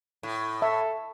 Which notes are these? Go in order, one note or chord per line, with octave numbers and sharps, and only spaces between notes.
A2
A4 E5